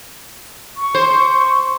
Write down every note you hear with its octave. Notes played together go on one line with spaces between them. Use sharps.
C#6
C5